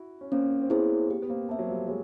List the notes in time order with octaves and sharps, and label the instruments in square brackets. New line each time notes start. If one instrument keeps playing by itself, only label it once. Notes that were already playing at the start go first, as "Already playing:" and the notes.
Already playing: [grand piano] E4 F#4
C#4
[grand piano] A#3 C4 [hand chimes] C#4
[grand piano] C4
[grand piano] B3 C#4 [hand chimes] E4 G#4 C5
[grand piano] A#3 C4 [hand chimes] G4
[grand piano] B3
A#3 C4
[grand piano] A#3 C4 [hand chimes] C5 E5 A5
[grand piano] F#3
F3 G3
F#3 G#3